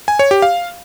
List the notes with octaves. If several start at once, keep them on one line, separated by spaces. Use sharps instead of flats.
G#5
C#5
G4
F5